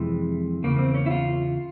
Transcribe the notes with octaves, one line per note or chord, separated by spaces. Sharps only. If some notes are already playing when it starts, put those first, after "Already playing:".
Already playing: F2 C3 E3 G#3
E2 C#3 A#3
C4
C#4
E4
F4